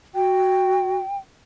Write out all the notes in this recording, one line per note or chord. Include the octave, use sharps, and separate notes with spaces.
F#4 G5